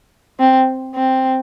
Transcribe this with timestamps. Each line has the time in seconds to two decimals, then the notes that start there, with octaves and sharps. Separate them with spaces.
0.39 C4
0.95 C4